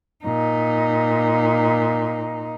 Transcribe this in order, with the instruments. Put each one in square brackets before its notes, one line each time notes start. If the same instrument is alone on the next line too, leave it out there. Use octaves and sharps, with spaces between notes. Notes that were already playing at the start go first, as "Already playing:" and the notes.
[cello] A#2 D#4